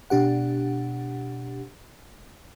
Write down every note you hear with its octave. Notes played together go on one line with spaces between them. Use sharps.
B2 D4 G4 F#5